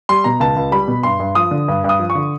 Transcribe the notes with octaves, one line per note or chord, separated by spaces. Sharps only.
G3 C6
B2 A#5
C#2 A5
C#2
G3 B5
B2
G2 C6
G2
F3 D#6
D3
G2
G2
D#6
F3
C#6
D3